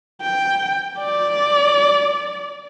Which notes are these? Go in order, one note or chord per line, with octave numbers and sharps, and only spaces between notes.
G5
D5